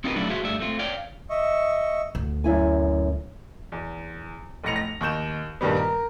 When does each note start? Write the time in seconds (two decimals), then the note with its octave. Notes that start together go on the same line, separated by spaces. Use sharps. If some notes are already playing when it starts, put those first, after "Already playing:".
0.04 C4 D#4 F4 G4 A#4 B4
0.16 F#3 G3 A3 C#4 D4 E4
0.30 F#4 G#4 C5 E5 F5
0.43 G2 A3 G4 D5 E5
0.60 A3 C4 F4
0.79 C#5 D5 F5 G5
1.30 D#5 E5 C#6
2.15 D2
2.44 F#2 E4 G#5
3.72 E2
4.64 F1 B1 A2 A#6 C#7 F7
4.76 A#6
5.01 D#2 C#6 G6 E7
5.61 G2 A#2 D#3 G3 B3
5.77 A#4